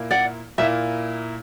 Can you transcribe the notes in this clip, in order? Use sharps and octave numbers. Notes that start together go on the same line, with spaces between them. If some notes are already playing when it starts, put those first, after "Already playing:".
Already playing: A#2 A#3 E4
D5 F#5
A#2 A#3 E4 E5